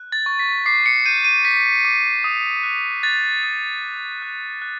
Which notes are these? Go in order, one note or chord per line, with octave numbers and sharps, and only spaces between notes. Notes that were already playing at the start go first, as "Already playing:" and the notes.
Already playing: F#6
A6
C#6
B6
D6 C7
C#7
G6 D#7
D#7
G6 B6
D6
D#6
F#6
F#6 A6
D#6
D6
F#6
F#6